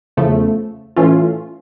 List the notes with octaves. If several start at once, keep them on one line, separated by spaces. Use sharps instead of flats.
E2 C#3 F3 A3
A2 E3 A3 C#4 F4